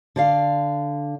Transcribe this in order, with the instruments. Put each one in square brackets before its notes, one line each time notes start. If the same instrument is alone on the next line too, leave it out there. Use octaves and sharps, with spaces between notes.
[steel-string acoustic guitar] D3 D5 F5